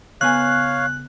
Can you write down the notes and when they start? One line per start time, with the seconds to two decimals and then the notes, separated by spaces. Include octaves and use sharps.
0.21 C#3 B3 C#5 F5 G#5 F#6